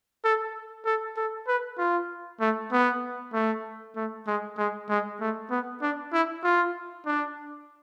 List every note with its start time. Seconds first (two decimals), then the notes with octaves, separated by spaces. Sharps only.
0.24 A4
0.86 A4
1.17 A4
1.48 B4
1.78 F4
2.40 A3
2.72 B3
3.33 A3
3.96 A3
4.27 G#3
4.58 G#3
4.89 G#3
5.20 A3
5.51 B3
5.82 D4
6.13 E4
6.44 F4
7.06 D4